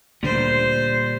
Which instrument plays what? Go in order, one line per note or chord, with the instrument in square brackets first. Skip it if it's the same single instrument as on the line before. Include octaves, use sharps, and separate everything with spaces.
[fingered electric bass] D2 D3 [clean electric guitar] A#2 G3 [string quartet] C5